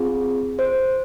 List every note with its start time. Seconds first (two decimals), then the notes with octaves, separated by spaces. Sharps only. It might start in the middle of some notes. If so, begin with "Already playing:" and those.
Already playing: C4 F4 G#4
0.59 C5